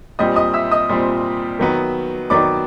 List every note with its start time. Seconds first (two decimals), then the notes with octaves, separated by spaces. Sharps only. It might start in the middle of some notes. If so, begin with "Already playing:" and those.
0.19 A#2 G3 C4 D#5 D#6
0.36 D#5 D#6
0.53 E5 E6
0.71 D#5 D#6
0.89 A#2 G3 C4
1.59 D#3 F#3 B3
2.30 D#3 F#3 B3 D5 D6